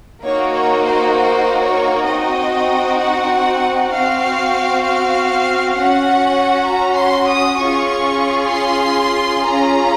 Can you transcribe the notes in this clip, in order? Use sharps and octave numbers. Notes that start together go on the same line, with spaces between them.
A#3 D#4 F#4 C#5
C#5
C5
C5
C#5
C4 D#4 F#4 D#5
F#5
C4 F#4 F5
F5
C#4 F#4 F#5
A#5
C6
D#6
C#4 F4 G#4 C#6
C6
C#4 F4 G#4 A#5